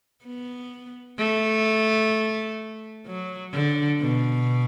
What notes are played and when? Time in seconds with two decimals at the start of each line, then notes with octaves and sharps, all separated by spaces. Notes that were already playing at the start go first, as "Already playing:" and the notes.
0.25 B3
1.19 A3
3.07 F#3
3.54 D3
4.01 B2